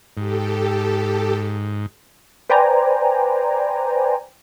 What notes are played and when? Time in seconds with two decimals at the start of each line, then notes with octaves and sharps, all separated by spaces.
0.17 G#2 G4 A4
2.49 B4 C5 D5 G5 G#5 A#5